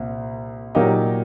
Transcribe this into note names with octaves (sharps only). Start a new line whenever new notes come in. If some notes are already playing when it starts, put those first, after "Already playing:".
Already playing: C2 A#2
A#2 F#3 A#3 D#4 G4